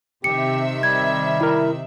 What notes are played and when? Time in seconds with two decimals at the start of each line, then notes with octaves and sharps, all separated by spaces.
0.24 C3 D#3 G4 E5 C#7
0.83 G3 G#6
1.41 E4 A#4